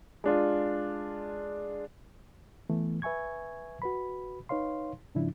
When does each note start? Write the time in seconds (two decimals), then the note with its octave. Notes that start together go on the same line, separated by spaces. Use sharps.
0.24 G#3 D4 F4
2.70 E3 A3 B3
3.02 B4 E5 G#5 C#6 G#6
3.82 F#4 B4 B5
4.49 D#4 B4 C#5 F5 C6
5.15 G#2 C#3 F3 D4 E4